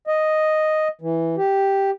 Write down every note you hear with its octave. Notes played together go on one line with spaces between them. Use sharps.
D#5
E3
G4